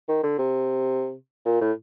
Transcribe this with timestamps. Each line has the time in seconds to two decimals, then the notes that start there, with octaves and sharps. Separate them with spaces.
0.08 D#3
0.23 D3
0.39 C3
1.46 A#2
1.61 A2